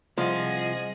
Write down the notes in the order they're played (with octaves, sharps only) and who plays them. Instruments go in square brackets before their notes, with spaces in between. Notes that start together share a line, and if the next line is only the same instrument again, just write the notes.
[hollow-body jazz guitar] C2 [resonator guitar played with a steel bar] F3 [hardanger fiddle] G#4 F#5 [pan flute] D#5